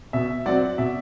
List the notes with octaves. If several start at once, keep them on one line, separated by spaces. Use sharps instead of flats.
B2 E5
F#3 C4 D5 F#5
B2 E5